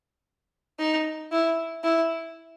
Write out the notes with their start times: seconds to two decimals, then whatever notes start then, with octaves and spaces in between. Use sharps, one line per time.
0.79 D#4
1.32 E4
1.84 E4